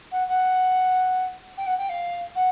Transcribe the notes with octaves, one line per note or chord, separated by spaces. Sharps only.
F#5
F#5
G5
F#5
G5
F5
F#5